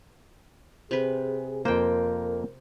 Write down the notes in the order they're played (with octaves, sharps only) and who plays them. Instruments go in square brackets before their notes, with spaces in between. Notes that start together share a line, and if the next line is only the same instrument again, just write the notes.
[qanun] C3 B4 [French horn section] G#4
[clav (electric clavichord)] F2 A#3 [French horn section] A#4 [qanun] C5 G5